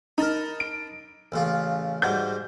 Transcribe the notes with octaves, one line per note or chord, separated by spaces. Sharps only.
D#4 A#4 A5 B5
D7
A1 C#3 F4
G#2 G3 F#4 G6